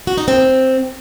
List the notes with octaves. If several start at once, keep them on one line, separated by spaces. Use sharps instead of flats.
F#4
D#4
C4